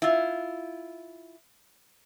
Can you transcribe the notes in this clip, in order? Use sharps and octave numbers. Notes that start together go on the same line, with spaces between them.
E4 F4